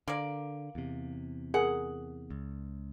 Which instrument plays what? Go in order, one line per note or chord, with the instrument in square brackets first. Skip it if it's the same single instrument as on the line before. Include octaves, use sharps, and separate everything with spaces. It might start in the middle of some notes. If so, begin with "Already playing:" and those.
[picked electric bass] D3 [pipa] A#3 A#4 D5
[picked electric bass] E2 C3
[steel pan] G#4 A#4 [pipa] F#5
[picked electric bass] C#2